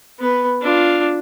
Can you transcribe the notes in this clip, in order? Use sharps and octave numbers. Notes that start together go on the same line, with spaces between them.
B3 B4
D4 F4